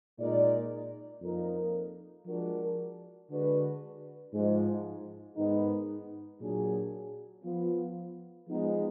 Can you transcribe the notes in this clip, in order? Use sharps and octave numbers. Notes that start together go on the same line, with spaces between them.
A#2 G#3 D#4 A#4 D5
F2 F3 A#3 D#4 A#4
F3 G#3 D4 F#4 A#4
D3 G#3 D4 F#4 B4
G#2 F3 G#3
G#2 D#3 G#3 B3 D#4
A#2 F#3 D4 G#4
F3 B3 F4
F3 G#3 B3 D#4